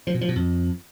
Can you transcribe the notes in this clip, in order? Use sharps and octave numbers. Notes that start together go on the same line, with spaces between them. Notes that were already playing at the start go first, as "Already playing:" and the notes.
F3
B2
F3
B2
F2